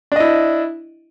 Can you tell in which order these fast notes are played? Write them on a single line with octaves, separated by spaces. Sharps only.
D4 D#5 E4